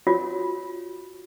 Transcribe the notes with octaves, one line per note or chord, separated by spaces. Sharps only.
F4 F#4 C#5